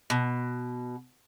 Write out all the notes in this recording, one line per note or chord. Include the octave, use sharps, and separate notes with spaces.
B2